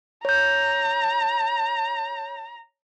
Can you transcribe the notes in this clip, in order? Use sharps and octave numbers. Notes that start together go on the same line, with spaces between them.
C#5 A#5 G6